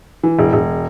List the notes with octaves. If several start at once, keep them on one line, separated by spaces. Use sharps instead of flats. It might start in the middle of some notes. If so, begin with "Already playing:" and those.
E3
E1
E1